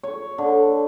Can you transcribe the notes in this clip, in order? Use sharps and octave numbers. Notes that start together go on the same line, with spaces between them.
C#5
D3